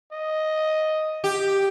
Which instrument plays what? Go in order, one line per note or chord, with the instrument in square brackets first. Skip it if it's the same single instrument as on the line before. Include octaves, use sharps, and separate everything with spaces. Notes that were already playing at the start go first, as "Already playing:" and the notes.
[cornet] D#5
[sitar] G4